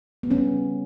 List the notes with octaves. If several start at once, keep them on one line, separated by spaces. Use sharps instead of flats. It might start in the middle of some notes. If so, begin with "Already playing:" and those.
B3
C#3 G3 C#4